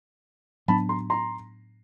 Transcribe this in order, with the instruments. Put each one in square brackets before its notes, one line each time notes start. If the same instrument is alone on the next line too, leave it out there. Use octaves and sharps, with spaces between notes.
[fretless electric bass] A2 F#3 B3 D4 [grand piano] A5 B5
[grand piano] A#5 C6
A#5 C6